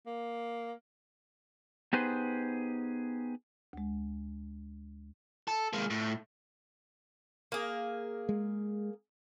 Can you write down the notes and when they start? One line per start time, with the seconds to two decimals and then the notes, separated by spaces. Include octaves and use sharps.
0.06 A#3
1.93 B3 D#4 G4 G#4 B4 C5
3.73 D2 G#3
5.48 A4
5.73 G#3 A#3
5.90 A2
7.52 A#3 G#4
8.29 G#3